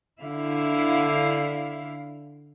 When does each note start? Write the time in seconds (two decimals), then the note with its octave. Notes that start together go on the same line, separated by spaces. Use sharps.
0.20 D3 E4 F5